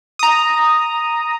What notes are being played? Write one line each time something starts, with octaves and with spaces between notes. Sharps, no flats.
A#5 D#6